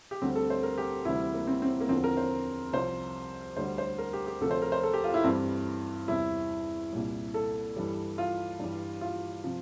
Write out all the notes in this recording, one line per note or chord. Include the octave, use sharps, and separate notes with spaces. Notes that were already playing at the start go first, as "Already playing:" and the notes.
G4
D2 D3 G3 C4
A4
C5
A#4
G4
D2 C3 E3 G3 E4
A#3
C4
C4
A#3
E2 D3 F3 C4
A#4
C5
C2 C3 F3 C5
D2 D3 G3 C5
C5
A#4
G4
G4
D2 C3 F3 A4
C5
A#4
C5
A4
G4
F4
E4
G2 E3 G3 C4
E2 C3 G3 E4
C2 A#2 G3
A4
G2 E3 G3
F4
G2 E3 G3
F4
C3 F3